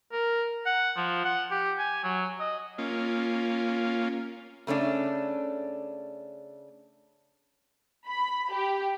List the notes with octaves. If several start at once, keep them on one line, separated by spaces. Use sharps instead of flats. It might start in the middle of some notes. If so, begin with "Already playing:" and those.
A#4
F#5
F3
F#5
G4
G#5
F#3
D#5
A#3 C#4 F4
C#3 A3 C#4 D4
B5
G4